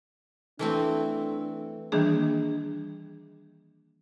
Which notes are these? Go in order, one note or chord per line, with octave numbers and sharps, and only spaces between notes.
E3 A3 C4 D4 A4
D#3 E3 G3 A#3 D4 G#4